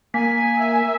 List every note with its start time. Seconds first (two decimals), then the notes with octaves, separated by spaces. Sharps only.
0.14 A#3 G#5 B6
0.58 E5